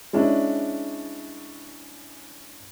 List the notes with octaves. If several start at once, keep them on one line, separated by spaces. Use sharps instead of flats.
G#3 C#4 D4 E4